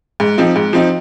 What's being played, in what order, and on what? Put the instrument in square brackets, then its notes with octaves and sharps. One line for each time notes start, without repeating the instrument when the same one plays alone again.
[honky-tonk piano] G#2
F3 C4 D#4
G#2
F3 C4 D#4